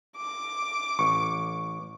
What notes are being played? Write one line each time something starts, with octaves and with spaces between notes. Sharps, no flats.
D6
A1 C#6